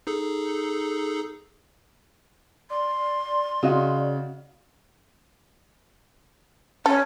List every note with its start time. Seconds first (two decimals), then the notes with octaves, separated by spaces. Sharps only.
0.07 D#4 G#4 A4
2.70 D5 C6
3.63 C#3 F#4 D#5 F5
6.86 C#4 A4